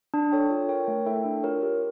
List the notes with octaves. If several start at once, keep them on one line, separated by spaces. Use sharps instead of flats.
D4
A4 C#5 G5
F4
A#4 C#5 G5
A3
E4 A4 E5 G5
D4
F4 A#4 C#5
G4